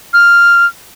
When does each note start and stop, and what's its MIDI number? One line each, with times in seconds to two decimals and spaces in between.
0.14 0.65 89